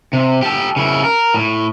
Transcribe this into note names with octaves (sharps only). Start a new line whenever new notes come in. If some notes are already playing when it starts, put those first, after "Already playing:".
C3
G4 A4
C#3 E4
A#4
A2